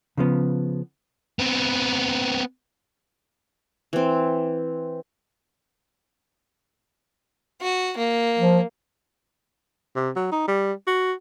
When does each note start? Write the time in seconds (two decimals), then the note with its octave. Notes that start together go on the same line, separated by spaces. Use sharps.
0.17 C#3 F3 B3
1.39 B3 C4
3.93 E3 C4
7.61 F#4
7.97 A#3
8.39 F3
9.96 C3
10.16 F#3
10.32 D#4
10.48 G3
10.87 F#4